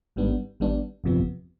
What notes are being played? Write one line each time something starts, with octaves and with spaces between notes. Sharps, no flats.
G#1 G#2 G3 B3 D4
G#1 G#2 G3 B3 D4
G1 F2 C3 F3 B3